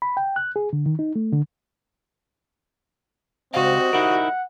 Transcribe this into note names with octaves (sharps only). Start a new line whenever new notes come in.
B5
G5
F#6
G#4
D3
D#3
D#4
A3
D3
C#2 B2 G3 C4 F#4 C5 D#5 F5
D#4 E4 A#4 F#5